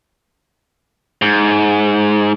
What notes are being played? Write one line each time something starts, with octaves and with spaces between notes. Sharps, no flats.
G#2